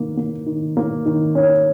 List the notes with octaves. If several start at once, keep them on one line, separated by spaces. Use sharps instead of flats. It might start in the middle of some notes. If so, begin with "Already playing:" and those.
Already playing: D#3 A#3
A#3
D#3
A#3
D#3
C#4